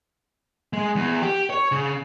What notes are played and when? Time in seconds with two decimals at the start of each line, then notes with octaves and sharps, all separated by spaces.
0.73 G#3
0.96 E2
1.22 G4
1.50 C#5
1.72 C#3